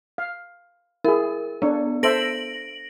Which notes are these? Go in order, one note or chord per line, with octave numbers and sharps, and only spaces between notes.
F5
E4 G#4 A#4
B3 D4 C#5
A4 C5 E5 A#6 D7 F#7